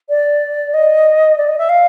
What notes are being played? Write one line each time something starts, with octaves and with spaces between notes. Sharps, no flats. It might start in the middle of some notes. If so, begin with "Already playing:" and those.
D5
D#5
D5
D#5
E5
F5